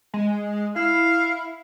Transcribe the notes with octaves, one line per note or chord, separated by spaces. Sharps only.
G#3
E4 F5